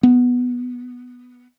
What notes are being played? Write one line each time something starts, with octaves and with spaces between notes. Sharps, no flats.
B3